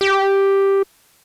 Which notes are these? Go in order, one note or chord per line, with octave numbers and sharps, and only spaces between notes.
G4